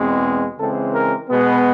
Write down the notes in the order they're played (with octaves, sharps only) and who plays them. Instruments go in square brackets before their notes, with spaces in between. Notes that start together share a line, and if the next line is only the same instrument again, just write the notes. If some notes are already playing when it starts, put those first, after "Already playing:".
Already playing: [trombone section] E2 B2 G#3 C4
C#3 E3 G#3 C4 A4
A#4
B2 G#3 B3